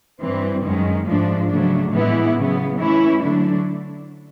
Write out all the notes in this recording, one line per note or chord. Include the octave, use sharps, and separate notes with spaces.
G2 E3 G3 C4
F#2 D#3 G#3 C#4
G#2 F3 A3 D4
C#3 F#3 A3 D4
A2 E3 G#3 B3 E4
C#3 F#3 B3
E3 A3 C#4 E4
D3 F#3 A3 D4